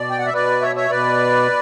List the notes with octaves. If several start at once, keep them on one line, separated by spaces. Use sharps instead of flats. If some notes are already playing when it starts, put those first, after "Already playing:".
Already playing: B2 D5
G5
F#5
E5
B2 B4 D5
C#5 E5
C#5 E5
B2 B4 D5